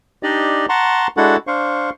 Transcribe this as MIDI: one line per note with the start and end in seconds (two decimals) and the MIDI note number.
0.23 0.66 62
0.23 0.66 63
0.23 0.66 67
0.23 0.66 74
0.23 0.66 75
0.69 1.07 78
0.69 1.07 81
0.69 1.07 82
0.69 1.07 84
0.69 1.07 85
1.17 1.36 56
1.17 1.36 62
1.17 1.36 64
1.17 1.36 66
1.17 1.36 69
1.17 1.36 78
1.47 1.90 62
1.47 1.90 72
1.47 1.90 77
1.47 1.90 85